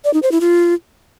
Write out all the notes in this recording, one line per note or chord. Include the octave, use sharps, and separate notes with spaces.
D5
D#4
C5
E4
F4